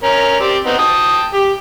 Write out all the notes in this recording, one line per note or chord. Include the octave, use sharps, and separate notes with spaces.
C#4 A#4
C4 G4 D5
B3 C4 D#4
G5 A5 D#6
G4